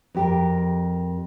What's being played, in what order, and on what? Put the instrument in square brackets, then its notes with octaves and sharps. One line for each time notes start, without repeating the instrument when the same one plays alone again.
[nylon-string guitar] F2 G4 A#4